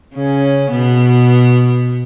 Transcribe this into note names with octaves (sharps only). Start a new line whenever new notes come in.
C#3 C#4
B2 B3